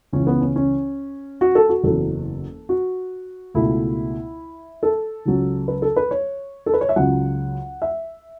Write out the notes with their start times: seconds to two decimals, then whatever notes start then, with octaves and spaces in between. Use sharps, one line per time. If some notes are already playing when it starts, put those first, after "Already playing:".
0.13 C#2 C#3 E3 C#4
0.27 B3
0.41 C#4
0.56 C#4
1.41 F#4
1.55 A4
1.69 F#4
1.84 F#1 E2 C#3 F#3 A4
2.69 F#4
3.54 C#2 B2 A3 E4
4.83 A4
5.25 C#2 C#3 F#3
5.68 B4
5.82 A4
5.96 B4
6.11 C#5
6.66 A4
6.74 B4
6.81 C#5
6.89 E5
6.96 C#2 C#3 F#3 F#5
7.82 E5